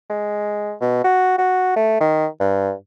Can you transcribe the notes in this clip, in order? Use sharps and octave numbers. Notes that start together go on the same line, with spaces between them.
G#3
B2
F#4
F#4
A3
D#3
G2